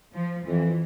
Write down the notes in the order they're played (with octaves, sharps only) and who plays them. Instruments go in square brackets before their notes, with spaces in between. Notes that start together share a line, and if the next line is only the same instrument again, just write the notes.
[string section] F3
[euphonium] F2 [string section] E3